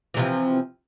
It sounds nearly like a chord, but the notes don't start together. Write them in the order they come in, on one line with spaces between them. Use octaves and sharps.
E3 C3 F3